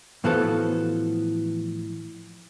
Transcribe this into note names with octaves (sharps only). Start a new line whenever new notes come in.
A2 E3 F3 B3 F#4 A4